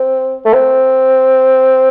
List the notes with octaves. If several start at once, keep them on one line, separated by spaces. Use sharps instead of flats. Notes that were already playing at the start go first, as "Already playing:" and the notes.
Already playing: C4
A3
C4